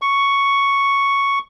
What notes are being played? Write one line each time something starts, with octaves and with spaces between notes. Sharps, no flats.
C#6